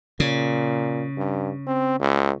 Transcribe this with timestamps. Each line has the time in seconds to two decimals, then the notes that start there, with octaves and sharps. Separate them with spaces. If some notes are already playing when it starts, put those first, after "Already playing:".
0.20 A#2 C#3
1.17 G2
1.67 C4
1.99 C#2